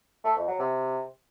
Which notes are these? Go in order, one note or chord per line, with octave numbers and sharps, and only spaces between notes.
A3
F2
F#3
C3